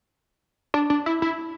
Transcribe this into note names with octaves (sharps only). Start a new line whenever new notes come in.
D4
D4
E4
E4